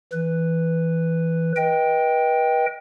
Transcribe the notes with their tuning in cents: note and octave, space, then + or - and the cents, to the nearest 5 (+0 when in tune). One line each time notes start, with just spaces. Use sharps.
E3 +0 B4 +0
B4 -35 D#5 +20 G5 +0